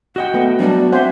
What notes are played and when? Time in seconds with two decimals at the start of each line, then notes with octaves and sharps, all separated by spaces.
0.16 F#4 D#5 F#5 G5
0.34 A3 B3
0.60 F#3 G3 B3 D4
0.92 C4 C5 E5 F#5 G#5